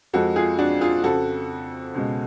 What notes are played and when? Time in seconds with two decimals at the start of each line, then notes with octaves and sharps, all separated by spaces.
0.13 F2 F3 G#3 F#4 A4
0.36 F4 G#4
0.59 D4 F#4
0.81 F4 G#4
1.04 F2 C#3 F3 F#4 A4
1.94 C#2 B2 G#3